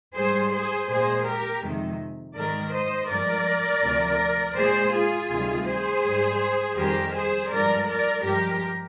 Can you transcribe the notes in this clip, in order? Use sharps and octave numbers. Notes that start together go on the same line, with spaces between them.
G#2 G3 G#4 C5
G#4 C5
A#2 G#3 G#4 C5
G4 A#4
F2 C3 D#3 G#3
G#2 D#3 G#3 A#4 D5
C5 D#5
G2 F3 G#3 A#4 D5
D2 C3 F3
A#2 G#3 G#4 C5
F4 G#4
D2 C3 D#3 G3
G#4 C5
G#2 G3
F2 D#3 G3 G4 A#4
G#4 C5
G2 F3 G#3 A#4 D5
A#4 D5
G2 F3 G#3 G4 A#4